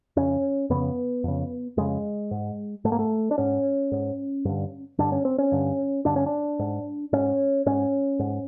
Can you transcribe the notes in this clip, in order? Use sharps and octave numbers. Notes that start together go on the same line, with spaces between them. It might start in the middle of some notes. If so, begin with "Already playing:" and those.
F2 C#3 C#4
F2 C#3 B3
F2 C#3
F2 C#3 G#3
G#2
G#2 A3
A#3
A3
D4
G#2 C#4
G#2
G2 D3
G2 D3 D4
C#4
C4
C#4
G2 D3
G2 D3 D4
C#4
D4
G#2
G#2 C#4
G#2 C#4
G#2